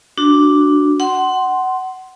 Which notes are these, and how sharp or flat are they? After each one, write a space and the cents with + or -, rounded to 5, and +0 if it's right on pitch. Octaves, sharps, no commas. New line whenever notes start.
D4 +0 F#4 +0
F#5 +20 C6 +0